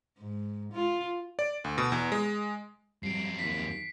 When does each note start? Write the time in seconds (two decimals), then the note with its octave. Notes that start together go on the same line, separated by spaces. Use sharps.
0.19 G#2
0.72 F4
1.39 D5
1.64 D2
1.78 B2
1.92 E2
2.12 G#3
3.03 F2 F#3 G3 C7 D7
3.39 D#2 B6